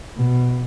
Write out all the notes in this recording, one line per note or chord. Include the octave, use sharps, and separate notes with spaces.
B2